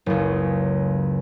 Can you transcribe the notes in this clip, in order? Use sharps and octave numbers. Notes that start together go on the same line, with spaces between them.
F#1 C#2